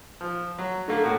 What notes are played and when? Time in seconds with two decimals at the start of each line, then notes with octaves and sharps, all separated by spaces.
0.21 F3
0.59 F#3
0.88 D3 A3 A#3
1.04 A2 F#4